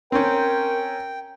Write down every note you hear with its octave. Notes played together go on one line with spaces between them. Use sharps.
C4 C#4 A#4 G5